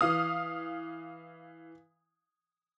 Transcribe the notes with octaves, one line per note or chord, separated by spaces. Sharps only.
E3 F5 D#6